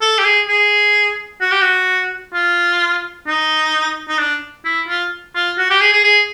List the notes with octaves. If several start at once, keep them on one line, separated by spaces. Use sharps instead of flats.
A4
G4
G#4
G#4
F#4
G4
F#4
F4
D#4
D#4
D4
E4
F4
F4
F#4
G4
G#4
G#4
G#4